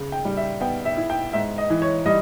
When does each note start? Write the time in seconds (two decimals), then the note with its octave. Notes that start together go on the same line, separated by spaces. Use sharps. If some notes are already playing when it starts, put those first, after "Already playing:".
Already playing: C#3
0.12 G5
0.25 G3
0.37 E5
0.61 B3 G5
0.85 E5
0.97 E4
1.10 G5
1.33 G#2 E5
1.58 D#5
1.70 E3
1.82 C#5
2.06 G3 D#5